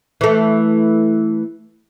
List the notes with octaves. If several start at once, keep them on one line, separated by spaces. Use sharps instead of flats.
E3 A3